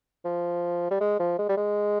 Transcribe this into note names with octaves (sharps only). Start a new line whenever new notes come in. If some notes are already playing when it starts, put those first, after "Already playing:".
F3
G3
G#3
F3
G#3
G3
G#3